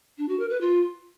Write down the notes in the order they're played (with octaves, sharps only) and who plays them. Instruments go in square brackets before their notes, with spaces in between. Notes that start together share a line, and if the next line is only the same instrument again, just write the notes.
[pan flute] D4
F#4
A#4
B4
F4